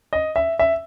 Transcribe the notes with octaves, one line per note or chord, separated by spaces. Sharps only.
D#5
E5
E5